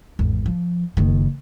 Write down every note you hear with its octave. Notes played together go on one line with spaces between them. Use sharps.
G#1 E2
F3
F#1 D#3